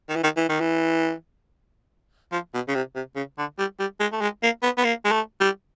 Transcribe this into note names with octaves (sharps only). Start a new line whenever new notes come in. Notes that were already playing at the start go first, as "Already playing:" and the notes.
D#3
E3
D#3
E3
D#3
E3
F3
B2
C#3
C3
C3
C#3
D3
G3
G3
G#3
A3
G#3
A#3
B3
B3
A#3
G#3
A3
G3